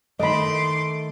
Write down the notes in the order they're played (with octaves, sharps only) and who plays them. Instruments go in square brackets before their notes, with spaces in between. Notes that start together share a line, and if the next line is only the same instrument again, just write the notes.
[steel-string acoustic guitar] D#3 A3 [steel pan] D#5 B5 [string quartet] C6 D6